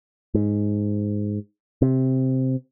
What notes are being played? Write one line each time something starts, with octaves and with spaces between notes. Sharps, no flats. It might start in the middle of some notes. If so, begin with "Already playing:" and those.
G#2
C3